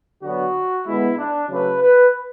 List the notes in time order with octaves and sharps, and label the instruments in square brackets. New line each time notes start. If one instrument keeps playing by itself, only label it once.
[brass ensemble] D3 F#3 B3 F#4
D3 G#3 B3 E4
D4
C#3 F#3 A3 B4
B4